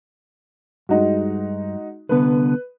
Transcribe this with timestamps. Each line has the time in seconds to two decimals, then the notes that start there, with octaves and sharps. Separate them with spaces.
0.89 G2 G#3 D#4 F#4
2.09 C2 D3 B3 B4